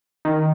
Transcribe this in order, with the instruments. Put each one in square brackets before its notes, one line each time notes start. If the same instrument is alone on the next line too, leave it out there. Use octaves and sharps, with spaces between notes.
[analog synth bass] D#3